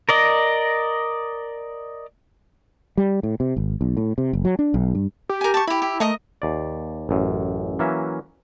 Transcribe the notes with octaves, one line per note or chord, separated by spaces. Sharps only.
A#4 D5 D#5
G3
A2
C3
G#1
B1
A2
C3
F#1
F#3
D4
B1
G2
G4
A#4 G#5
A5 C#6
E4 G4 B5
G4
A3 A#4 D#5 D#6
D#2 D5
A1 F#2
E3 F#3 A#3 C#4 E5